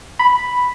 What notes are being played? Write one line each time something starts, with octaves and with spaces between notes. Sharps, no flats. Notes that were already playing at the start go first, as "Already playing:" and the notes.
B5